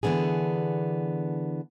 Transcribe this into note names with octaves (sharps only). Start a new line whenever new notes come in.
D3 E3 B3 D4 G#4